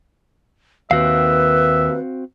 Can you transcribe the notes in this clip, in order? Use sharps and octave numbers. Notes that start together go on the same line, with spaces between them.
D#2 C4 F#4 B4 E5 F5